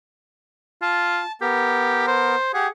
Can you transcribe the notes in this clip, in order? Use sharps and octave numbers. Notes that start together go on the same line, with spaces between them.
F4 A5
B3 G4 A#4
C5
G4 G#4 F#5